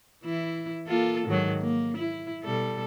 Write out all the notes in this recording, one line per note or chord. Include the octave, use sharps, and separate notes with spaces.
E3 E4
A#3 F4 A4
G#2 D#3 F#3
A#3
E4
B2 G3 A4